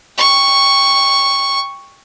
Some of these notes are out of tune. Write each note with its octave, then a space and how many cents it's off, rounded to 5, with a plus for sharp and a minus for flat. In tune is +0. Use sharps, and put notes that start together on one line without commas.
G5 +20 C#6 +0